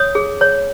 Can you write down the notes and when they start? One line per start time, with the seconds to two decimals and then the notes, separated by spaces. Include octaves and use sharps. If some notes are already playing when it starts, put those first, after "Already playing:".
Already playing: C#5 D#6
0.15 G#4
0.41 C#5